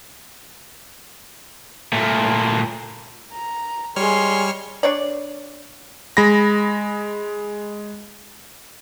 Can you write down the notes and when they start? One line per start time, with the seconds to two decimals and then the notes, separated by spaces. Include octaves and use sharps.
1.93 A#2 A3
3.33 A#5
3.96 G3 G#3 C#5 C6 F6
4.83 D4 C#5 D5
6.17 G#3 B5 A#6